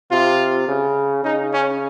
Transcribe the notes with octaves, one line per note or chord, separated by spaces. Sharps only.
C3 F4
C#3
C#3 D#4
C#4